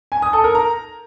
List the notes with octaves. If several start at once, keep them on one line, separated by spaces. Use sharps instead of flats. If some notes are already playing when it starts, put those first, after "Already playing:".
G#5
D#6
A4
A#4
A#5